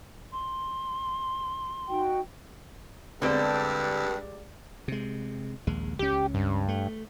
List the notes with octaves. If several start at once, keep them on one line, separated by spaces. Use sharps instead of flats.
C6
D#4 F#4 G5
G2 D3 G#3 C4 G4 D5
C3 G#3
A#1 D#2 G#3
C#2 C#4 G4
G2
A3